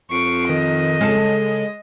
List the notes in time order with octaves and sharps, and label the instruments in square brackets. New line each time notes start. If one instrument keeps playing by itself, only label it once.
[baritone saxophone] F2 [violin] C#6 D7 [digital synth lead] C7
[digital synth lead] D#3 [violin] D#5
[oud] C#3 A4 [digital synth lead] G#3